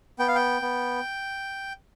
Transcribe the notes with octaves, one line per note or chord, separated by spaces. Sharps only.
B3 G5
F5
G5
B3